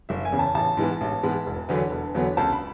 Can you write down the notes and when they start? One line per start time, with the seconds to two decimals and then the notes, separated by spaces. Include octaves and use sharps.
0.09 F#1 E5
0.25 G#5
0.32 E2 C#3
0.39 A5
0.54 A1 A5
0.77 G#2 E3 G#3 B3
1.01 A1
1.23 G#2 E3 G#3 B3
1.46 E1
1.69 E2 D3 F#3 B3
1.91 E1
2.15 E2 D3 F#3 B3
2.37 C#2 A5
2.53 B5